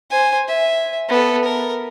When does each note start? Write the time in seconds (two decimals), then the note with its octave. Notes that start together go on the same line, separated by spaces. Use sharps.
0.10 C5 G#5
0.48 E5
1.09 B3 A4
1.45 A#4